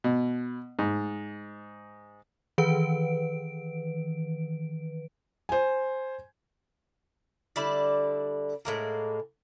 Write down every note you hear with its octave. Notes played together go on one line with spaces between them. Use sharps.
B2
G#2
D#3 E3 B4 D7
C5 G#5
D3 G3 E4 D5
A2 G#3 A#3